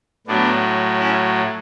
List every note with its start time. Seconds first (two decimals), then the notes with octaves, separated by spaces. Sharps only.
0.27 A2 F#3 B3 D4
0.99 C#4 E4